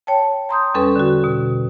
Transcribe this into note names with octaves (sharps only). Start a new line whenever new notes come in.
C#5 G5 A5
A#5 C6 D#6 G6
E2 G3 C#4 A4 B4
D3 F#4
B2